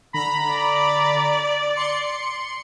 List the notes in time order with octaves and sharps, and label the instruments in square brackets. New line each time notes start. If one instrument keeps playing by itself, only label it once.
[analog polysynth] D3 A#5 B5
[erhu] D5
[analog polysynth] C6 C#7